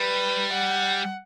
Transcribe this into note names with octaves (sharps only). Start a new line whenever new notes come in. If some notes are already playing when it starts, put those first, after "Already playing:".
Already playing: G3 B4
F#5